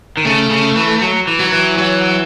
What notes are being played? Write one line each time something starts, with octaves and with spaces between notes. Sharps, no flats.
D#3
C#3 A3
C#3
E3
F#3
E3
F#3
E3
F#3